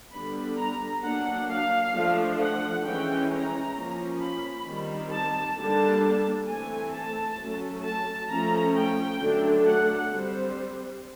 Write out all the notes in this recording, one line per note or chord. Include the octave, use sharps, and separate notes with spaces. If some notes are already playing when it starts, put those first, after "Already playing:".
D3 G3 B3 D4 B5
A#5
F#3 A#3 D4 F#5
F5
F3 A3 D4
F#5
E3 G#3 C#4 G5
A#5
F3 A#3 C#4
B5
D#3 G3 C4
A5
D3 G3 A#3 D4 A5
E3 A3 C4 G#5
A5
F#3 A3 C#4
A5
F3 A3 C#4 A#5
G5
D3 F#3 A3 D4
F#5
G3 C4 C5